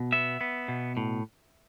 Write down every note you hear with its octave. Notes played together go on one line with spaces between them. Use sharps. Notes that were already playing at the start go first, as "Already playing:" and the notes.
Already playing: B2
B3 E5
B3
B2
A2